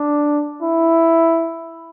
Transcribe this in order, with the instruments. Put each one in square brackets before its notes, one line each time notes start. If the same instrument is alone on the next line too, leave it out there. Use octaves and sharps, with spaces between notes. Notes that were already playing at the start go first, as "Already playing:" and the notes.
Already playing: [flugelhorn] D4
E4